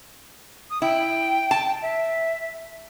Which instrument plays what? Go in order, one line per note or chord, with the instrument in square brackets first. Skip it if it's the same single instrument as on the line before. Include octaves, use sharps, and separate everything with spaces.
[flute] D#6
[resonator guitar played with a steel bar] E4 [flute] G5
[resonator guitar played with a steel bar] A5
[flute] E5